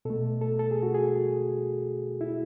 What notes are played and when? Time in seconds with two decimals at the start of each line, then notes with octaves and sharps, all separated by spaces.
0.05 B2 A3 A4
0.41 A4
0.59 A4
0.71 G#4
0.83 F#4
0.95 G#4
2.21 E4